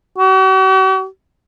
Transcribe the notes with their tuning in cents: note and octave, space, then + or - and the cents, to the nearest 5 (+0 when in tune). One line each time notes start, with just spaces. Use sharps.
F#4 +45